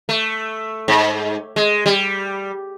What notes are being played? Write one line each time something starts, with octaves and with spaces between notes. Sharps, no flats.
A3
G#2
G#3
G3